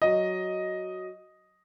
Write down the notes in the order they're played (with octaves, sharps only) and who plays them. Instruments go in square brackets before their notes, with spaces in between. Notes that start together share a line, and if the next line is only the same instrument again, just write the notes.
[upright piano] F#3 D#5